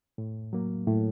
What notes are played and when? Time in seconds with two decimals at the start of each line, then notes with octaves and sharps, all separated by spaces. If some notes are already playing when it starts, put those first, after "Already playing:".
0.18 A2
0.53 F#3 A#3
0.87 A2